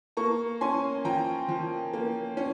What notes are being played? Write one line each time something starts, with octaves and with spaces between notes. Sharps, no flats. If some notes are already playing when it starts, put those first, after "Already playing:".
A#3 A#5 C#6
C#4 G#5 C6
F3 G5 A#5
F3
A#3
C#4